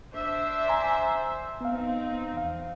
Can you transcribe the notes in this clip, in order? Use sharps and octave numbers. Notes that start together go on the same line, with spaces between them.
D4 C5 E5
G#5 A#5 C6
B3 C4 D#4 F5
E2 F5